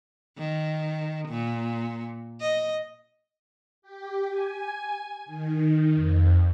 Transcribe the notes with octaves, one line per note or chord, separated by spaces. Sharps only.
D#3
A#2
D#5
G4
G#5
D#3
F2